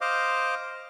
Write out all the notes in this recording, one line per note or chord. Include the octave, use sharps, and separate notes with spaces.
C5 D#5 F5 D6